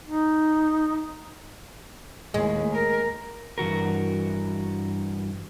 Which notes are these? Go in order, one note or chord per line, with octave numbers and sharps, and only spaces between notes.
D#4
D#2 A2 G#3
A#4
G2 E3 F#4 A#4